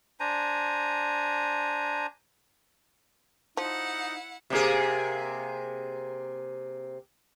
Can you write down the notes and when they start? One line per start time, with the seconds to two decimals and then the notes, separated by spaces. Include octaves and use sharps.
0.20 D4 C5 G#5 A#5
3.57 F3 D#4 E4 F#5
4.50 C3 A#3 G#4